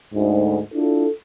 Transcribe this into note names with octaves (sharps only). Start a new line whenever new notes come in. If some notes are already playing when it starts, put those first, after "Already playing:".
D2 G#2
D4 E4 F4 A4